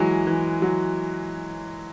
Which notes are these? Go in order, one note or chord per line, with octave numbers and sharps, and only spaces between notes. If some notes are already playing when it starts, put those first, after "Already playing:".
Already playing: E3 F#3 G#3
E3
F#3